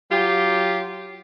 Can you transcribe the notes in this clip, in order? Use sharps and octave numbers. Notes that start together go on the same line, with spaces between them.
F#3 F4 G4